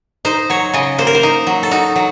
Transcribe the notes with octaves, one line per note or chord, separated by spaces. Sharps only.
D#4 C5
F#3 C#5
C#3 D#5
A#3 C5
A#4
C5
D#4
F#3
A4
D#4 F#4
F#3